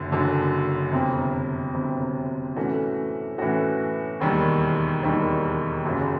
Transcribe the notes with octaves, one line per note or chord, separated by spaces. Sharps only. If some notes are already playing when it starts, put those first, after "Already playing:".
Already playing: F#1 F#2 D3
F#1 F#2 D3
G1 F2 C3
G1 F2 C3
A2 E3 A3 C#4 F#4
A2 E3 A3 C#4 F#4
E1 D#2 D#3 G3
E1 D#2 D#3 G3
F#1 F#2 C#3